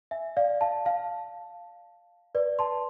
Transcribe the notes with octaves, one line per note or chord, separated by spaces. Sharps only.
E5 G#5
D5 F5
F5 A5
F5 A5
B4 D5
A5 C6